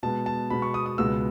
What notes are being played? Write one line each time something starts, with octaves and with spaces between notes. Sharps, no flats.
B2 G#3 B3 A5
A5
B2 G#3 B3 B5
C#6
D#6
D#6
C#2 B2 G#3 B3 E6